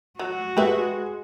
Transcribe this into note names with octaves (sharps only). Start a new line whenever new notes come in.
F#3 F#4
G#3 G4 B4 E5